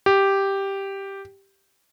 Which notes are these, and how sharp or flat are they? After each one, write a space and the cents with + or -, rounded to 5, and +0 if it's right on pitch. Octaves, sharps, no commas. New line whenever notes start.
G4 +0